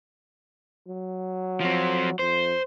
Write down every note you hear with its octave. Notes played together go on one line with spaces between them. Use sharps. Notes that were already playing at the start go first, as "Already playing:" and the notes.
F#3
F3 C4
F2 C5